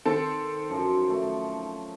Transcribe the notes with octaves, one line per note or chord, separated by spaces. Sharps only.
D#3 C4 A4 C6
F#2 F3
A3